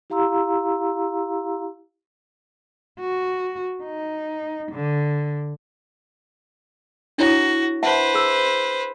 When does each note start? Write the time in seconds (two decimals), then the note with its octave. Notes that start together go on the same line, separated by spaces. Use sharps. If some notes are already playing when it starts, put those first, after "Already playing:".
0.10 E4 G4 F5 A#5 C6 E6
3.00 F#4
3.84 D#4
4.72 D3
7.18 D4 E4 F#4 C#5
7.83 B4 C5 E5 F#5 A5
8.14 G#4 E6